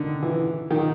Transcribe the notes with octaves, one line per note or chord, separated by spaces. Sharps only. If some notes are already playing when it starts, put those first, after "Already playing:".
Already playing: D3 D#3
E3
D#3